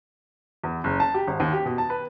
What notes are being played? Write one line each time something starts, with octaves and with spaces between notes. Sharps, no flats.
E2
F#1
A5
G4
G#1
D#2
G4
B2
A5
B4